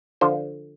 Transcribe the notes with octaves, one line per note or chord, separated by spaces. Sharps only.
D3 F3 C5